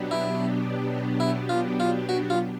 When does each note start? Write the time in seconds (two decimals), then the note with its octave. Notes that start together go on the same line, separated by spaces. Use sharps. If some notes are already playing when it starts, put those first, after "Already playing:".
Already playing: B2 F#3 B3 D4 G4
0.11 E4
1.20 E4
1.49 F4
1.80 F4
2.09 F#4
2.30 F4